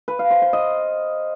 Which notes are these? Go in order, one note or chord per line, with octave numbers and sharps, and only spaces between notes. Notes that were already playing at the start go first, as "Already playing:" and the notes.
B4
F5
C5
C5
D#5